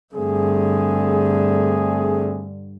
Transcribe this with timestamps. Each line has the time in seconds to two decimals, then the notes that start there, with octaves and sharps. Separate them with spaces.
0.14 G2 D3 A3 C4 G#4